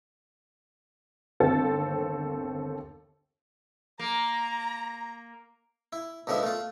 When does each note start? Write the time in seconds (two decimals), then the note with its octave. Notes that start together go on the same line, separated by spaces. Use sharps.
1.40 G1 D#2 C4 A4 A6
3.99 A#3 A#5
5.93 E4
6.27 B1 D3 F3 G#3 E5
6.43 A3 F4